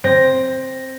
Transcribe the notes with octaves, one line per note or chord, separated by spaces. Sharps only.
C4 A#6